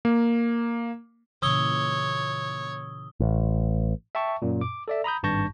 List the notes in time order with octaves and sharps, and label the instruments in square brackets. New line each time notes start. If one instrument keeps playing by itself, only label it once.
[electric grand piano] A#3
[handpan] A#2 C#3 E3 [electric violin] C#5 [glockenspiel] D#6 E6 G7
[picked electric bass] A1
[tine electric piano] E5 G5 A5 C#6
F#2 A#2
D6
A4 D5 E5
A#5 B5 D#6 G6
G#1 G2 A5 C#6 G6 A#6